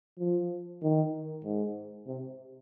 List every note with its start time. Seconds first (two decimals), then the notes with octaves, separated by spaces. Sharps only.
0.19 F3
0.83 D#3
1.44 G#2
2.07 C3